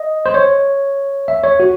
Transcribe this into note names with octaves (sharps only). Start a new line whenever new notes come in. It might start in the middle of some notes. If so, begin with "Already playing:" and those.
Already playing: D#5
C5
C#5
E5
C#5
F#4